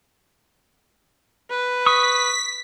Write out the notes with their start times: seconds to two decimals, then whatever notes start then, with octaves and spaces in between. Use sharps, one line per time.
1.50 B4
1.86 C#6 D#6 B6